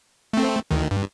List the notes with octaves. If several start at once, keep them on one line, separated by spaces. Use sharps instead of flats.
A3 C4
D2 D#3
G2